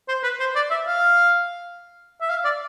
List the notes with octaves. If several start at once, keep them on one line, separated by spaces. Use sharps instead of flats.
C5
B4
C5
D5
E5
F5
E5
F5
D5